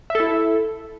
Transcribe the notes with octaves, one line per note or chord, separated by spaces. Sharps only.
E4 A4 E5